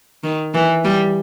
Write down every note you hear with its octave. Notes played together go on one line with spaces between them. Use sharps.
D#3
E3
G3